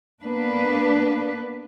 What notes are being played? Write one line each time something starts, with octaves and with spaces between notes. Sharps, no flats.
A#3 B3 D4 B4